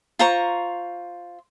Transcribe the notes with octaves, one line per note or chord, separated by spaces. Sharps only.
F4 C5 A#5 C#6